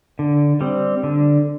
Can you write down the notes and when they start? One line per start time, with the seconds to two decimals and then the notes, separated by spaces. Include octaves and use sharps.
0.19 D3
0.61 G3 C4
1.03 D3